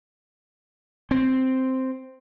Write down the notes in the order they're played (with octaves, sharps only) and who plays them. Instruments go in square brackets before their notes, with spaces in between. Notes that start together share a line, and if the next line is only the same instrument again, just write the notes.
[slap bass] C4